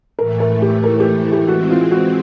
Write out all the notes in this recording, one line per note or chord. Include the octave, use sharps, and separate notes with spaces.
A2 E3 A3 A#4
A#4
G4
A#4
G4
G4
E3 G#3 C4 F#4
F4
F#4